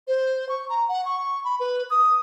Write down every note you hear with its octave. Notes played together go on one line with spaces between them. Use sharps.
C5
C#6
A#5
F#5
C#6
B5
B4
D#6